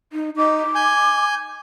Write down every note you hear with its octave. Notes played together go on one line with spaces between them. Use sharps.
D#4
D#4 D6
G#5 G6